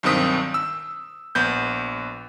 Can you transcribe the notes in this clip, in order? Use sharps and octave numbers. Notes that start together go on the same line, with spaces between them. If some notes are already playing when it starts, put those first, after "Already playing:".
B1 G2 D#3 C4 D#6 B6
E6
A#1 B3 G6